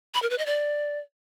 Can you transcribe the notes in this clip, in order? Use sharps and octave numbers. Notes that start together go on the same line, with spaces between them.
B5
A#4
B4
D#5
D5